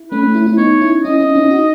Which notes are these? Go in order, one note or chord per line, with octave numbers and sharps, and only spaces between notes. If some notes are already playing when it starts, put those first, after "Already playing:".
Already playing: E4
A3 C#4 B4
A3 C#4
C#4 E4
C#4 E4
B3 D#4 C#5
C#4 E4
C#4 E4 D#5
C#4 E4
C#4 E4
D#4 F#4